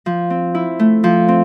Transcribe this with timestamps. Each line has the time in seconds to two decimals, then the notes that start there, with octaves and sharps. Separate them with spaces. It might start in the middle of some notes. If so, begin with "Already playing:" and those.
0.06 F3
0.30 C4
0.55 E4
0.79 A3
1.04 F3
1.28 C4